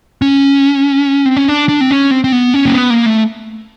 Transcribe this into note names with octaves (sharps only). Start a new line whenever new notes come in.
C#4
C4
C#4
D4
D4
C4
C#4
C4
C4
B3
C#4
A#3
B3
A#3
A3